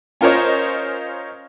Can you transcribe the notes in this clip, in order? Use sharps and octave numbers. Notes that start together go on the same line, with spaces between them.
C#4 F4 A#4 C5 C#5 D#5